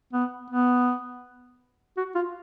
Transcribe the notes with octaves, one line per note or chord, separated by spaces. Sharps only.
B3
B3
F#4
F4